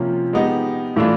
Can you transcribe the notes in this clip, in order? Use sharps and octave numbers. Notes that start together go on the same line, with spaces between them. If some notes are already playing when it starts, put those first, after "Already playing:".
Already playing: C3 F3 A#3 C#4 F4
G#3 B3 D#4 G4
A2 E3 A3 D4 F4